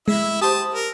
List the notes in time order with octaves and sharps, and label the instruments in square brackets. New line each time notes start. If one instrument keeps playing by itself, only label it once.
[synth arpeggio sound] G#3 [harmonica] E4 E5
[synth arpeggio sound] G4 C5 [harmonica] A5 D#6
[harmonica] A#4